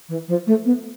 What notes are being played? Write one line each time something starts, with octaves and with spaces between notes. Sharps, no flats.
E3
F3
A3
B3